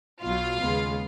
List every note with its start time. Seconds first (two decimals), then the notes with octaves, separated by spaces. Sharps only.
0.22 B1 B2 F#3 F4 F5
0.60 D#2 C#3 G#3 B3